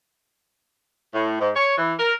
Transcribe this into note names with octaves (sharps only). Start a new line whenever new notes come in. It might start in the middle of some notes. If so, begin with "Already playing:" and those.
A2
G#2
C#5
E3
A#4